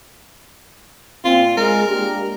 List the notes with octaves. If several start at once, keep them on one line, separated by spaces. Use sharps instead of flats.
A#2 C4 F4
G#3 A#4
A#3 D4 G4